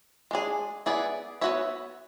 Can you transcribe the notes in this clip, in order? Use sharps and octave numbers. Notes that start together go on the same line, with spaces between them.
G#3 D4 G#4
B3 E4 G#4 D5
B3 F#4 C#5 E5